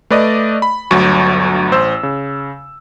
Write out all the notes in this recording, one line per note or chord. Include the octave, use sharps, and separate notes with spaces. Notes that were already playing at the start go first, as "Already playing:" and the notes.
A3 B4 D5 D#5
B5
G1 D2 F#3 C#6
A1 C5 E6
C#3